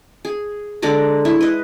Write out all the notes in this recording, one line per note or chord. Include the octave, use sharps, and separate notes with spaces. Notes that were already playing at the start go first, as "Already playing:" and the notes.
G#4
D3 G#3 D5 A#5
E4
B4 D#5